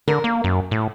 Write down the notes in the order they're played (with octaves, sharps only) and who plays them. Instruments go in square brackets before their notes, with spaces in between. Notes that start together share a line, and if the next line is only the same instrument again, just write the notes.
[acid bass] D3 [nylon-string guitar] A#4
[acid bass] A#3
F#2
A2